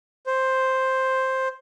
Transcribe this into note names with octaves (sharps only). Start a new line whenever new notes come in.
C5